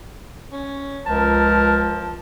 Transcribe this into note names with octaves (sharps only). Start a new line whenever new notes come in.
C#4
C#2 F3 A#4 A5